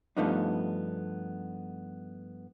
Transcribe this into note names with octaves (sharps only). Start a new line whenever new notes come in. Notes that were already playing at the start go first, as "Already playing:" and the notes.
G2 F3 A3 B3 D4 D#4